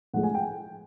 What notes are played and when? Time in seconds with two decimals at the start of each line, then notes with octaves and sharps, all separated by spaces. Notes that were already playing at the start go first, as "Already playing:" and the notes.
0.14 A2 F3 G#3 F#5
0.23 G#5
0.35 G5